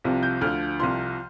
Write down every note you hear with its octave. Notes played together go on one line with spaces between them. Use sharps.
C2 C3 F3
G6
D2 D3 F3 F6
C2 C3 F3 C6